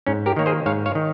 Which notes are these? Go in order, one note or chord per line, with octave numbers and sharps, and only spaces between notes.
G#2 C#4
G4 A#4
D#3 A#3 C#5
G#4 C5
G#2 C#5 F5
C#5 F5
D#3